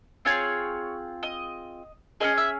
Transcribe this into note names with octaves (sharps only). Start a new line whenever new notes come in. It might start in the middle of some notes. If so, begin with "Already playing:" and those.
C4 F4 G#4 C#5
D#5
C#4 E4 G#4 D#5
E5